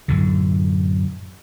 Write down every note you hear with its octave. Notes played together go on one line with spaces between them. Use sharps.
F#2 A2 D3